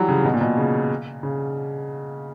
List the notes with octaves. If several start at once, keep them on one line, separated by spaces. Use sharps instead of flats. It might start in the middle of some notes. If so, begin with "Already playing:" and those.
Already playing: E3 F#3 G3
C#3
B2
A#2
B2
C#3
C#3